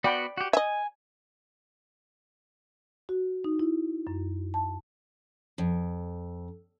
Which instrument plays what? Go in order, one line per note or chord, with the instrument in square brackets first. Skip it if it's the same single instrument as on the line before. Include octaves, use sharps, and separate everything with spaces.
[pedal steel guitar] B3 F#4 [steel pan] D5 G5 B5
[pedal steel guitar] F#4 G4
[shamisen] D#5 E5 [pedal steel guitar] G#5
[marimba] F#4
D#4
E4
F#2
A5
[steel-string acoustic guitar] F2